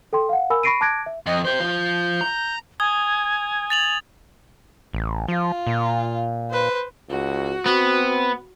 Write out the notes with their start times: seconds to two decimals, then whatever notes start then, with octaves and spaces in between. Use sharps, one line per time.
0.13 A4 G5 C6
0.29 F5 F#5
0.50 A#4 G#5 B5 E6
0.63 B5 C#6 A#6 C7 D7 D#7
0.81 A5 D6 F#6 G#6 A#6 D7
1.06 E5
1.26 F2 D#5
1.45 G4 C5 G6
1.60 F3 F4
2.21 A#5
2.80 G#5 D#6 G#6 G7
3.70 A6 F7 F#7
4.93 A1
5.28 F3 F4
5.67 A#2
6.51 B4 C5
7.10 C#2 F#4
7.66 B3 C4